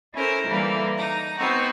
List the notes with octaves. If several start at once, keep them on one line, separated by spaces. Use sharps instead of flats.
C#4 E4 A4 A#4 C5
D3 E3 G3 A#3
D#4 A#5
B3 C4 D#4 F#4